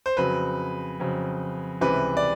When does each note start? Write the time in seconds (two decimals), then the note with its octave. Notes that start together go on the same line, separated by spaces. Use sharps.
0.06 C5
0.17 F2 C#3 F#3 B4
1.00 F2 C#3 F#3
1.81 C#2 C3 E3 G3 B4
2.17 D5